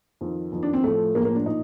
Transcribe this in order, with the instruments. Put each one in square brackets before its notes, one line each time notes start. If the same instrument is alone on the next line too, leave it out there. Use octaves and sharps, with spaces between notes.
[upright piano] F2 D#3
F2 D#3
D4
C4
A2 F3 A3
A2 F3 A#3
A#3
D4
A#2 D#4